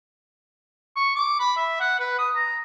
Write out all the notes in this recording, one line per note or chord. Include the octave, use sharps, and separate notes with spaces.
C#6
D6
B5
E5
F#5
B4
D#6
A#5